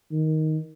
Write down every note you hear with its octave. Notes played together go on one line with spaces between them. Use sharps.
D#3